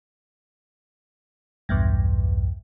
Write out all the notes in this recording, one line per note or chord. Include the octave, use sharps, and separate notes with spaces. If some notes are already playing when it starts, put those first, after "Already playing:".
B1 E2 G2